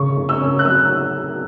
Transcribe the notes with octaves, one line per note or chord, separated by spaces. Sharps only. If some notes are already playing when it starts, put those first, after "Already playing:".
Already playing: C#3 C#6
C#3
E6
C#4
F#6
F#3 E6